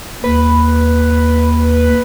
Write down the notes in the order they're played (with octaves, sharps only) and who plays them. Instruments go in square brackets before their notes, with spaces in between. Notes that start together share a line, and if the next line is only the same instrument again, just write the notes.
[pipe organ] D#2 [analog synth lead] B4